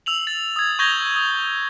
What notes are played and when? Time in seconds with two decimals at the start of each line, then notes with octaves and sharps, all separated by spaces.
0.06 E6 F7 F#7
0.27 A6
0.56 D#6 G#6
0.79 C#6 G6 G#6 A#6 G7
1.16 D#6